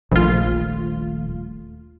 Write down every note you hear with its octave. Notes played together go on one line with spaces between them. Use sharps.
D#1 A#1 A3 F4